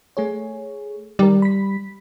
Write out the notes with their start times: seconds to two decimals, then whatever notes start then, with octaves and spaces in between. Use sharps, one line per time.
0.17 A3 G#4 C#5
1.19 D#3 G3 A#4
1.42 B5 B6